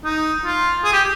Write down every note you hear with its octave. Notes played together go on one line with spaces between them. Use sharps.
D#4
F4
G#4
G4